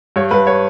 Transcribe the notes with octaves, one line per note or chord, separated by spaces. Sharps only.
G2 C#5
G2 B4
C#5